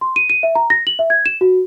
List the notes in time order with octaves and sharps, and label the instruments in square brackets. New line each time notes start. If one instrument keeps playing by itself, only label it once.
[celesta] C6
D#7
D#7
E5
A#5
A#6
F#7
E5
G#6
E7
F#4